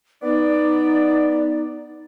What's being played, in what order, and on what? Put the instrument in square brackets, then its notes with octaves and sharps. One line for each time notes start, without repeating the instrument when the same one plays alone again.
[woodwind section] B3 D5 [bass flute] D#4